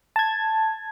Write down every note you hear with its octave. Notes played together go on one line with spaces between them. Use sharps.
A5 G#6